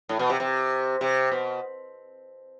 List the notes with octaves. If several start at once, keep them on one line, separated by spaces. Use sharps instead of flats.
A2
B2
C3
C3
C3
B2